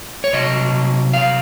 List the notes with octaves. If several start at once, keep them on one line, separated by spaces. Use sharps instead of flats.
C#5
C3 F#3 D#5
F5